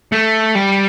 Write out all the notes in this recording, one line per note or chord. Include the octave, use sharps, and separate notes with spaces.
A3
G3